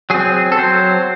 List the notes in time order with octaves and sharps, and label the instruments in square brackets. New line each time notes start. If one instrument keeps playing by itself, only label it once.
[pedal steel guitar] F#3 C4 G#4
A4
F#3 C4 C5